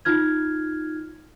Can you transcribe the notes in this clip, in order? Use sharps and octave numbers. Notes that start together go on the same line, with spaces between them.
D#4 F4 F6 G#6